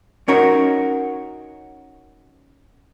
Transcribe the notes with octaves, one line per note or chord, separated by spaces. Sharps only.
C#4 D#4 F#4 A#4 C#5